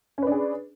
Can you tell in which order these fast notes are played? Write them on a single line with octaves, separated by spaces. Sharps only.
C#4 B4 D4 G#4